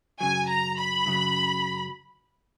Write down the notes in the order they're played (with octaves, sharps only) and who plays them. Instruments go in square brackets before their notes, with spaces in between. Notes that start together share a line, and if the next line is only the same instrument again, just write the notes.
[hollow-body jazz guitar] F#2 C#3 F#3 [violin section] G#5
[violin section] A#5
B5
[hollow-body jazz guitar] F#2 C#3 F#3